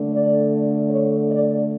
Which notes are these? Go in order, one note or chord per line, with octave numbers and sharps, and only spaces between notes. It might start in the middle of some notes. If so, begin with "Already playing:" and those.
Already playing: D3 A3 D4
D5
C#5
D5